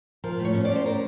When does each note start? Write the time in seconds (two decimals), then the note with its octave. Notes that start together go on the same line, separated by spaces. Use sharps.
0.24 F3 A#4
0.40 A2
0.45 C#5
0.55 C#4
0.65 D5
0.71 C#4 C5
0.86 A#4